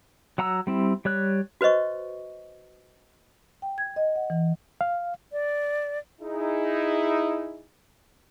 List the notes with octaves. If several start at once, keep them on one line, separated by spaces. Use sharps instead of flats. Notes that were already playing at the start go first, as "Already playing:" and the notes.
F#3 F#5 A#5 E6
G3 C4 E4
G3 C#5 F#6
F#4 B4 C5 D#5 C#6
G5
G#6
D#5
F#5
E3
F5
D5
D#4 E4 G#4